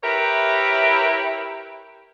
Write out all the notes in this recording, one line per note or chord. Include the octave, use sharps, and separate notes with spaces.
E4 G4 A#4 B4 C#5 E5